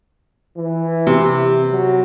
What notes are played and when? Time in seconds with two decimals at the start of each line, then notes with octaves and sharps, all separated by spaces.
0.58 E3
1.07 C3
1.72 F#3